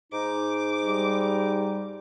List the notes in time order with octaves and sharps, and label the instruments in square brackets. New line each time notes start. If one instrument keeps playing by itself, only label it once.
[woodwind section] G#2 D#4 [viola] D6
[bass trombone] G3